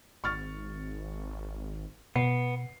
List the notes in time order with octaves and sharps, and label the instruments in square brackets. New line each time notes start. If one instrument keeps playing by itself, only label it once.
[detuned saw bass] G#1 [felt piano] C#6 F6 A6
[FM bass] B2 [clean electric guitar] B3 [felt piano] C7